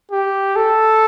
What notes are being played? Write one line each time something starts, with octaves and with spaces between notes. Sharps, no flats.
G4
A4